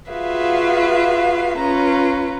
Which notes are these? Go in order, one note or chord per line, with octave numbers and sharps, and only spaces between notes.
F4 F#4 G#4 B4 E5 F5
C#4 F4 B4 A#5